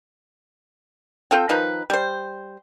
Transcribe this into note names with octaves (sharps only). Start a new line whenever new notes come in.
C4 F4 A4 G5
D#3 F3 D#4 B4
G3 C5